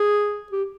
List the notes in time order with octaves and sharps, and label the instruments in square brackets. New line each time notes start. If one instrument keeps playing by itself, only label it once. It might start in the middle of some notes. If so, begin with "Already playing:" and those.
Already playing: [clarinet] G#4
G4